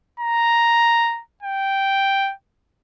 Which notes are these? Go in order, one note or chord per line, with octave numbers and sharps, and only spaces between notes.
A#5
G5